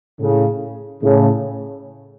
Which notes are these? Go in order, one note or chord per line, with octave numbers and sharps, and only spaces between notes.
A2 C#3
A2 C#3